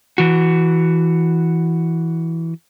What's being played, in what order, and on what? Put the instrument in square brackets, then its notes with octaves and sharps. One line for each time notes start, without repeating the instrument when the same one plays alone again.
[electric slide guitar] E3 F#4